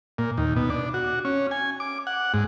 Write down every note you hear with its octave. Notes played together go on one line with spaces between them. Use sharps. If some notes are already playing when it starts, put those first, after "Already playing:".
A#2
D#2
B2
D4
F#4
C#4
G#5
D6
F#5
G#2